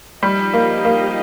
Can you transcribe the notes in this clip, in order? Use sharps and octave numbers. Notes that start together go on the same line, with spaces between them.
F3 G3 D#4 G4 D#5
A#3
A#3